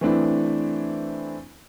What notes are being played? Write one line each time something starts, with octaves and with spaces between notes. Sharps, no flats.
E3 A3 C4 D4 E4